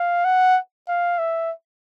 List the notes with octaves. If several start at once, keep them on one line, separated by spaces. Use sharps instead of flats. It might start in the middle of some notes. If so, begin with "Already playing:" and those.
Already playing: F5
F#5
F5
E5